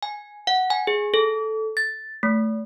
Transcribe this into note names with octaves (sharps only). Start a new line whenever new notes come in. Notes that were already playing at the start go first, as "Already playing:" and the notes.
G#5
F#5
G#5
G#4
A4
A6
A3